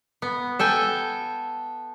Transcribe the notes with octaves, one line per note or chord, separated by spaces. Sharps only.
B3
A4 G5 G#5